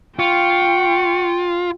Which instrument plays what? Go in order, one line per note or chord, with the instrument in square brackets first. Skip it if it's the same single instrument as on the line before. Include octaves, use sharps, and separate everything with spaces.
[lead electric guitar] F4 [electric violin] G5 [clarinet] C#6